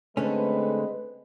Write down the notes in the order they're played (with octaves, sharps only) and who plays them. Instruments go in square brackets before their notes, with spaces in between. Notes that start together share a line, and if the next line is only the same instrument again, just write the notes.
[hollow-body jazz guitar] D3 A3 C#4 [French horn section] G#3 C4 B4